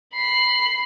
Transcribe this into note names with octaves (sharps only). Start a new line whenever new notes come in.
B5 C7